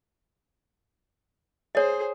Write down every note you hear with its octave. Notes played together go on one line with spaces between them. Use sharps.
G#4 C5 C#5 D#5